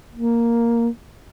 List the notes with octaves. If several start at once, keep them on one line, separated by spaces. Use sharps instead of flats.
A#3